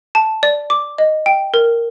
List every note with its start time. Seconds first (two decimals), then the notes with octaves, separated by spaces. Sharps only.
0.15 A5
0.43 D5
0.70 D6
0.98 D#5
1.26 G5
1.54 A#4